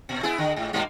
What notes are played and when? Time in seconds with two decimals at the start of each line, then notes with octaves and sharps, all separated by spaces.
0.09 A#2
0.23 B3 E4 G#4
0.38 D3
0.56 G#2
0.73 G2 B2 A#3